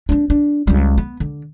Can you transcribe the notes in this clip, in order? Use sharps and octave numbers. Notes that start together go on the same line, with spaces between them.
C4 D4
D4
C#2 G3
B3
D3